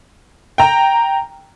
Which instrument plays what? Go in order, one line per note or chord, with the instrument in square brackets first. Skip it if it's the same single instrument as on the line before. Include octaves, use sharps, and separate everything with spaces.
[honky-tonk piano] G5 A#5